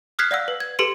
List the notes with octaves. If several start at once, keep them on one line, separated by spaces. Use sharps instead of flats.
D#6 F6 F#6 G#6 B6 C7
D5 F5 F#5 E6
B4
G#6
G4 A4 B4 C6 C#7 D#7